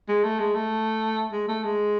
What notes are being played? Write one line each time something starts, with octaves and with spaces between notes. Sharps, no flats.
G#3
A3
G#3
A3
G#3
A3
G#3